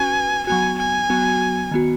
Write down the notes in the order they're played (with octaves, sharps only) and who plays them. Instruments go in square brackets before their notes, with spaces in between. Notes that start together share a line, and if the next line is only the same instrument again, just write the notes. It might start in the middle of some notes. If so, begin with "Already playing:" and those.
Already playing: [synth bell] C#4 F#4 B4 [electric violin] G#5
[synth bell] F#3 B3 F#4 [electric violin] G#5
[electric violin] G#5
[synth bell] F#3 B3 F#4
D#3 B3 F#4